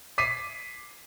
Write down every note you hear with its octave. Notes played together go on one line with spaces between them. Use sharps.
D6 B6 C7 D#7